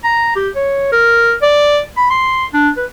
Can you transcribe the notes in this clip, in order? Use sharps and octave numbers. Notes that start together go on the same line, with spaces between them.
A#5
G4
C#5
A#4
D5
B5
C6
D4
B4